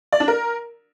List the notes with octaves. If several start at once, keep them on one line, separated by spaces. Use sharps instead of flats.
D5
D4
A#4